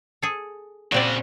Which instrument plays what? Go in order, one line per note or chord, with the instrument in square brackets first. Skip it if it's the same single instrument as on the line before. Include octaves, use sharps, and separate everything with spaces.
[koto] G#4 A4
[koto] A#2 C4 D5 [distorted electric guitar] C#3 F#4